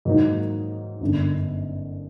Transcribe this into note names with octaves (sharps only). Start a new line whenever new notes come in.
G#2 D#3 F#3 A#3 D#4
G1 F#2 D3